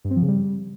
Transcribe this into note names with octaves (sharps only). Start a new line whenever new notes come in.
G2
C4
F3
C#3
G3